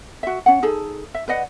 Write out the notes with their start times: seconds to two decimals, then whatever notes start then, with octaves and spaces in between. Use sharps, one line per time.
0.23 F#4 E5
0.46 C#4 F#5
0.63 D#4 G#4 A4
1.14 E5
1.28 B4 D5 D#5 F#5